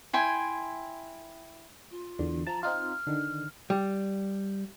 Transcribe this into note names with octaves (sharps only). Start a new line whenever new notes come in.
E4 G5 G#5 C6
F4
E2 D3
F3 A5 A#5
C4 D#4 F4 F6
D3 D#3
G3